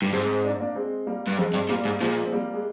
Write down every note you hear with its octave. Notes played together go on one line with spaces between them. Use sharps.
G2
G#2 G#3 C4
D4
C4
A#3 D4
G#3 C4
G3 A#3
G2
F2 G#3 C4
G2
A#2 G3 A#3
G#2
A#2 F3 G#3
C4
G3 A#3
G#3